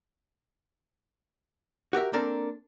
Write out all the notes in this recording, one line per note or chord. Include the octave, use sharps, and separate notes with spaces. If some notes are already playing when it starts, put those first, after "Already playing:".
F#4 G4 A#4 E5
A#3 C4 D4 A4 A#4